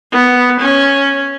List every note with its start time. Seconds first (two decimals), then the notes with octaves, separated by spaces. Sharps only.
0.12 B3
0.60 C#4